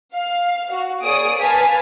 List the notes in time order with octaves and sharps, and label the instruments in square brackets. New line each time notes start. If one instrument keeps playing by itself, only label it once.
[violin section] F5
F#4
A#3 G#4 C#5 D5 D#6 D7
B4 F5 G#5 A5 B6